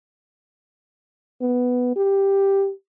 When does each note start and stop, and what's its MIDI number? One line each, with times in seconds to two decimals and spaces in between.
1.41 1.92 59
1.96 2.71 67